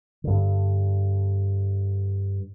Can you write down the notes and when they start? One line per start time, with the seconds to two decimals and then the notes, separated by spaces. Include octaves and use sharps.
0.24 G2 D3